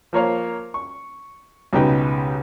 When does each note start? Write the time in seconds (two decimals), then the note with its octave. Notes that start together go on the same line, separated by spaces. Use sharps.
0.13 F3 A#3 C#5 F5
0.74 C#6
1.73 C#2 B2 D#4 G4 B4 G5